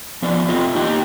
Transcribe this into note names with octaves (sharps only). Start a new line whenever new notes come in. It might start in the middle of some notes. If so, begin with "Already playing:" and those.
F3 B3 F4 D5
C4 F4 A4 D#5 E5
A#3 D#4 G4 D#5 G5